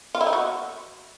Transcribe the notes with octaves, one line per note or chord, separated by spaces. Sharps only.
F4
E4
D#4
F#4